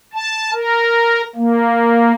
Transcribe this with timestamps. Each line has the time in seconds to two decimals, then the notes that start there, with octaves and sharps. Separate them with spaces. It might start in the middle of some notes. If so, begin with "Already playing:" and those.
0.14 A5
0.53 A#4
1.35 A#3